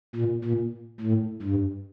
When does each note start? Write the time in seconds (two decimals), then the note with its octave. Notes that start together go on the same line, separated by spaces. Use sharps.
0.16 A#2
0.45 A#2
1.01 A2
1.42 G2